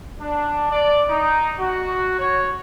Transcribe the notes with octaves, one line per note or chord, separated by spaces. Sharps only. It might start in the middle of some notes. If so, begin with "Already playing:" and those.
D4
D5
D#4
F#4
C#5